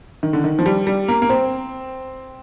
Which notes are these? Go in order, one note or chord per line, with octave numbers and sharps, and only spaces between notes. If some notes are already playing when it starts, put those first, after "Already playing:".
D#3
D3
D#3
F3
G3
G3
A#3
A#3
C4